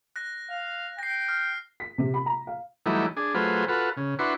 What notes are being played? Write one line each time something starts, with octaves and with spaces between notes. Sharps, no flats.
F#6 A#6
F5
G5 A#6 C7
F6
B6
C3
B5
A#5
F5
E3 F#3 G3 A3 D#4 E4
D4 G#4
F#3 A3 F4 G#4 B4 C5
F4 F#4 A4 B4
C#3
D4 E4 F#4 B4 C6 C#6